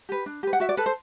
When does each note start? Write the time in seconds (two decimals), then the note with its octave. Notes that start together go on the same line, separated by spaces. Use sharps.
0.09 G4 B4
0.26 D4
0.43 G4 B4
0.53 F#5
0.60 F#4 E5
0.69 D5
0.77 A4 B4
0.86 C5